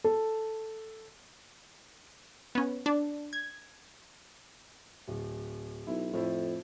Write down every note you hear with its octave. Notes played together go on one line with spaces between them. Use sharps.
A4
B3 C#4
D4
G#6
D1
B1 E4
F2 A2 F3 E4